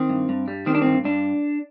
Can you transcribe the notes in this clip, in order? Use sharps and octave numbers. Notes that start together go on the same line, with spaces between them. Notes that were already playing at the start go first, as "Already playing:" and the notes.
Already playing: D#3 C4
G2
G2
G3
D#3 C4
D4
G2 C4
G2 D4